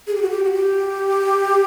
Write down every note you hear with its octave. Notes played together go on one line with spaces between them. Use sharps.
G#4
G4
F#4
G4
F#4
G4